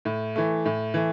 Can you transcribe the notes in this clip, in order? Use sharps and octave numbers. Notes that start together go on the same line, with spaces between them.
A2
E3 A3
A2
E3 A3